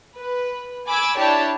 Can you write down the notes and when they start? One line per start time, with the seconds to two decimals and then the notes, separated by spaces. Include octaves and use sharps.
0.18 B4
0.88 G#5 B5 D6 E6 G#6
1.18 D4 E4 G4 C#5 A5